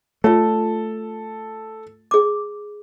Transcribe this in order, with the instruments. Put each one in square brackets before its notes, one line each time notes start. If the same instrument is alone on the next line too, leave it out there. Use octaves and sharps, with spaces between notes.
[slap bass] A3 [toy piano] F4 C#5 [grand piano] A4
[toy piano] G#4 D6